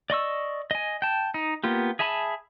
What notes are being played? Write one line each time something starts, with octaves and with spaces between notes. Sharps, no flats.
D5 D#5 C#6 E6
D#5 G#5
G5 A5
D#4
A#3 B3 F4 G4
G#4 E5 G#5 A5 B5